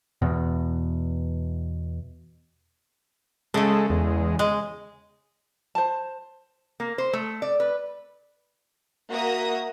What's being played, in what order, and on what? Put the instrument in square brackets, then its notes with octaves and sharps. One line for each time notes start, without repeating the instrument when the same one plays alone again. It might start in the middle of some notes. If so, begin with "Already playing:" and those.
[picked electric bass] E2 B2
[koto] C#3 A3 [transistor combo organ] G#3 A4
[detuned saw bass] E2 [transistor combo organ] G#3
[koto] G#3
[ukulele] C5 A5
[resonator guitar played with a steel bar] A#3
C5
A3
D5
B4
[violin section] A#3 F#4 E5 A#5 D#6 A#6